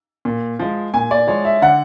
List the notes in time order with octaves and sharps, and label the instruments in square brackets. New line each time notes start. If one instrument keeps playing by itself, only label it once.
[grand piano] A#2
F3 G#3
[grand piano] A#2 [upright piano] G#5
[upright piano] D5
[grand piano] F3 G#3 [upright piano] C#5
[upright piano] E5
[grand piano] D3 [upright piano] F#5